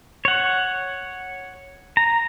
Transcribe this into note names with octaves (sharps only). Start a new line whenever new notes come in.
C#5 F#5
A#5